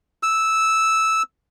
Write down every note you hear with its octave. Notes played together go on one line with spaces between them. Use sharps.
E6